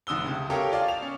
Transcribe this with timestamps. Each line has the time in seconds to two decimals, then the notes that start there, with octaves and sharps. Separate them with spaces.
0.07 F1 D3 D#6 E6 G7
0.23 C#2 C3
0.50 G4 A4 A#4 C#5 F5
0.72 F4 D5 F5
0.88 F7
1.02 C#4